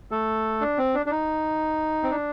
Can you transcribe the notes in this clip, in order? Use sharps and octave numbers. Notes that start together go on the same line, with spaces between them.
A3 A4
D4
C4
D4
D4
D#4
C4
D4